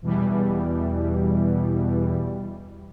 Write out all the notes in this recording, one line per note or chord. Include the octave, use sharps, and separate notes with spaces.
E2 B2 E3 G3